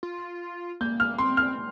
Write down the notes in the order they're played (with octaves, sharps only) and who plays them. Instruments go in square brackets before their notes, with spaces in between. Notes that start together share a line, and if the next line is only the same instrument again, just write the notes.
[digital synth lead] F4
[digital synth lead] A#3 [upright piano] G6
[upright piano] F6
[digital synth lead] C4 [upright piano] C6
[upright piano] F6